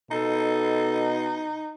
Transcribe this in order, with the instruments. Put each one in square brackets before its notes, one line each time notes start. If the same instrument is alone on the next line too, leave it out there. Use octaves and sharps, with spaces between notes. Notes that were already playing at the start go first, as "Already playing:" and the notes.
[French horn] B2 [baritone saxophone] D#4 [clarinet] A4